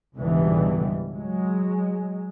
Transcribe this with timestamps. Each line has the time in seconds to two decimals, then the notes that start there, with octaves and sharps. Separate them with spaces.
0.15 C#2 G#2 B2 D3 E3 G3
1.11 F#3 G#3